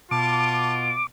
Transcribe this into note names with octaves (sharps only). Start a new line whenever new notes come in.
B2 F4 A5 D6